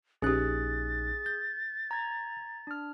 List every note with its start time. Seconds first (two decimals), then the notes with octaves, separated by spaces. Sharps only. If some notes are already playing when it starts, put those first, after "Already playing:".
0.22 A#1 C#4 D#4 G4 G#4 F#6 A6
1.26 G6
1.91 A#5 G#6
2.67 D4 F6